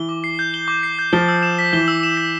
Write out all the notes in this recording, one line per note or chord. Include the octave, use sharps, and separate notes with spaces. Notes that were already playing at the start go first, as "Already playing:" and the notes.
Already playing: E3 G7
D6
C7
G6
G7
D6
C7
G6
F3 G7
E6
E7
B6
E3 G7
E6
E7
B6